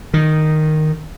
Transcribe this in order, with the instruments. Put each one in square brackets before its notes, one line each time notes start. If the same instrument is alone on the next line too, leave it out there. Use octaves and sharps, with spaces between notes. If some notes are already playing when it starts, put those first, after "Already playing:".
[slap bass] D#3